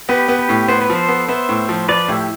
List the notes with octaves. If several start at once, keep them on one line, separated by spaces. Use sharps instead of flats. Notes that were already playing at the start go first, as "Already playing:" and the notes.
B3 G4 B4
B3
G4 B4
A2
B3 C5
B4
F3
A4 C5
B3
B3 C5 E5
A2
F3
F3 B4 D5
A2 E4 G4